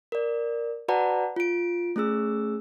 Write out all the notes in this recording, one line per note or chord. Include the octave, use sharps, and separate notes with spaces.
A#4 D5
F#4 B4 D5 F#5 A5 A#5
F4 D7
A3 C#4 G#4 E6